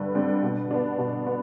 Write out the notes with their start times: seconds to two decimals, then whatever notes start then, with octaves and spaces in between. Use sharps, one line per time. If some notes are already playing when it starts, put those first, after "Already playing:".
Already playing: G2 D3 G3 B4
0.15 D3 G3 C4
0.43 B2
0.71 B3 D4
0.98 B2
1.26 B3